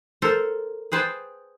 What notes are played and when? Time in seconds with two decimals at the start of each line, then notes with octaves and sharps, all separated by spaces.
0.22 A4 A#4 C5
0.92 G#4 B4 C5 G5 A5